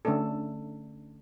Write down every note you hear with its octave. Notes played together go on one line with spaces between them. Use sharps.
D3 A3 C#4 D4 A4